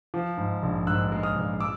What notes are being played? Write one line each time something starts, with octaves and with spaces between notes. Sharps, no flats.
F3
G#2
A#1
G#2 E6 F#6
G#3
D#6 F6
A#1
D6 E6